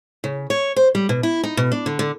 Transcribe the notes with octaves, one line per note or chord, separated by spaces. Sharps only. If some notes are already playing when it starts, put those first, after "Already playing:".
C#3
C#5
C5
G3
B2
E4
D#4
B2
D4
D3
D3